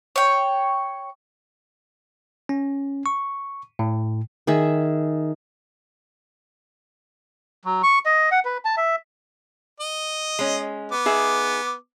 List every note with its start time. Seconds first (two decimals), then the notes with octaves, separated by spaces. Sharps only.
0.16 C#5 G5
2.49 C#4
3.06 C#6
3.79 A2
4.47 D#3 G#4 E5
7.65 F#3
7.83 C#6
8.05 D#5
8.31 F#5
8.45 B4
8.65 A5
8.77 E5
9.80 D#5
10.39 G#3 C#4
10.92 B3 D6
11.05 D#4 G#4 E5